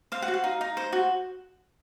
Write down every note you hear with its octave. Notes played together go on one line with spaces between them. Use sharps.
C5 F5
F#5
F#4
F5
D#4
D#4
C5
F#4